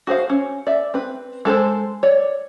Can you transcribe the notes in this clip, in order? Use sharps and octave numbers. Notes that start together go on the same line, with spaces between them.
F#4 G#4 C5 F5
C#4
D5 E5
C4 B4
G#3 A4 B4 C5
C#5 D5